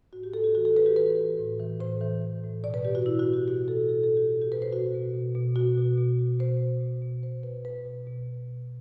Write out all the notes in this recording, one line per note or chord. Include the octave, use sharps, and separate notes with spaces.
A2 F#4
G4
A2 A4
G4
E3 F#4
A4
E3 B4
G4
E3 B4
E3
A2
E3
A2 C5
E3
E3
A2
B2 D5
B4
B2 G4
F#4
B2 E4
F#4
B2
G4
B2 G4
B2 A4
B2 A4
A4
B2
G4
B2
G4
B2 B4
C5
B2 F#4
B2
B2
B2
B2 F#4
B2
B2
B2
B2 C5
B2
B2
B2
B2 C5
B2 B4
B2 B4
B2
B2
B2
B2